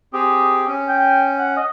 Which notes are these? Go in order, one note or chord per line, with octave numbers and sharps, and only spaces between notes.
C4 G4 G#4
C#4
G5
F#5
D#5